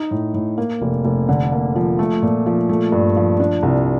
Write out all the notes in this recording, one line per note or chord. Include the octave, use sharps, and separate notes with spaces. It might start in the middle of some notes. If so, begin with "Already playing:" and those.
Already playing: D#4
A2
A2
A#3
F1
F1
D3
A#3
F3
A3
A#2
F3
A3
G2
F3
D4
C2